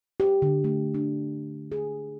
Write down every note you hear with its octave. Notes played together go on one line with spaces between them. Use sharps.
G4
D3
A3
D4
G#4